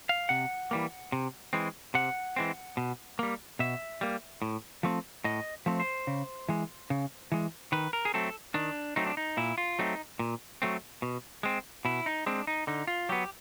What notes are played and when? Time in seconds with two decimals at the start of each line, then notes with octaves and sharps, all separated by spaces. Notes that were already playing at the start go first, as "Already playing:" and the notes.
0.09 F5
0.29 C3 F#5
0.71 E3 G3 A#3
1.12 C3
1.53 E3 G#3 C4
1.94 C3 F#5
2.36 E3 G#3 C4
2.77 B2
3.19 G3 A#3
3.59 B2 E5
4.01 G3 A#3
4.42 A2
4.83 F3 A3 C4
5.24 A2 D#5
5.66 F3 A3 C4
5.80 C5
6.07 C#3
6.49 E3 G#3
6.90 C#3
7.32 E3 G#3
7.72 D#3 B4
7.93 A#4
8.05 G#4
8.14 F#3 A3 C4 A4
8.54 D#3 D4
8.96 F#3 A3 C4 D#4
9.06 D4
9.17 D#4
9.37 A#2 E4
9.58 F4
9.79 F#3 A3 C4 D#4
10.19 A#2
10.62 F#3 A3 C4
11.02 B2
11.43 G#3 C4
11.85 B2 E4
12.06 D#4
12.26 G#3 C4 D4
12.47 D#4
12.67 D3 D#4
12.87 F4
13.09 F#3 B3 G4